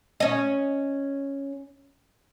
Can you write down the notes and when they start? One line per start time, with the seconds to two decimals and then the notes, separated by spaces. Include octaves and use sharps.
0.20 C#4 D#5